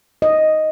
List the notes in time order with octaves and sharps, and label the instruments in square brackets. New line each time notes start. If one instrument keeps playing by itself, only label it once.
[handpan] D#5